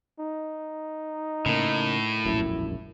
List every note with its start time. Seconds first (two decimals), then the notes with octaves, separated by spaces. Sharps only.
0.19 D#4
1.46 A2 C#3 A#3
2.25 E1 A#1 F#2 E4